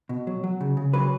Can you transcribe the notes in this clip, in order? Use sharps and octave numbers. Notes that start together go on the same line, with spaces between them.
B2
F#3
F#3
C#3
C#3
F#3 B4